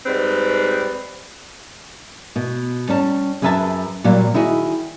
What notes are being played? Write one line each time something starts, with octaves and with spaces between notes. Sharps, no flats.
G#2 G3 C4 B4
B2
G3 C#4 A5
F#2 G#4 B4 E5 G#5 A5
A#2 F#3 G3
D#3 E4 F#4 G#4